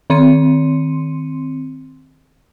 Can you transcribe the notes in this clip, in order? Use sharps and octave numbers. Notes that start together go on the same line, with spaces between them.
D#3 C4 C6 C#7 D#7